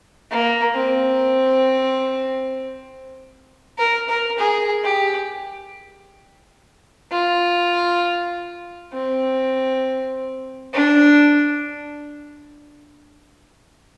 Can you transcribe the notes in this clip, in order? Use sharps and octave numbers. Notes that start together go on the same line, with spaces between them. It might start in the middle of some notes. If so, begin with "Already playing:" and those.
A#3
C4
A#4
A#4
G#4
G4
F4
C4
D4